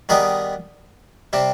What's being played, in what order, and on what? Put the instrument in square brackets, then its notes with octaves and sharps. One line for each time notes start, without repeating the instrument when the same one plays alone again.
[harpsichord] D#3 G3 B3 D#4 G#4
C3 G3 C4